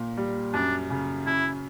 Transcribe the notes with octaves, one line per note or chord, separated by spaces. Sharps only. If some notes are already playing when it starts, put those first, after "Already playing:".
Already playing: A#2
G3
F#2 D4
C#3
F#2 E4